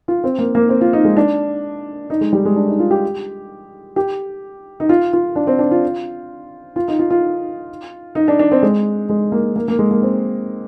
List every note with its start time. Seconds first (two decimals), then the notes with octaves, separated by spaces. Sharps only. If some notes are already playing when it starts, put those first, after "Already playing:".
0.08 F4
0.24 C4
0.38 A#3
0.55 A#3
0.69 C4
0.81 F4
0.93 D#4
1.05 G#3
1.17 D4
2.10 D#4
2.21 G#3
2.33 G3
2.45 G#3
2.56 D4
2.67 D#4
2.79 F4
2.91 G4
3.96 G4
4.80 D#4
4.89 F4
5.13 F4
5.36 D4
5.47 C4
5.59 D4
5.71 F4
6.76 F4
6.88 D#4
6.99 F4
7.10 F4
8.15 D#4
8.28 D4
8.39 D4
8.52 C4
8.63 G#3
9.09 G#3
9.32 A#3
9.56 A#3
9.68 A#3
9.79 G#3
9.91 A#3
10.02 C4